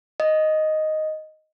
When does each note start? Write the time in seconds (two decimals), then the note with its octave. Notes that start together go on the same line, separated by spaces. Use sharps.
0.20 D#5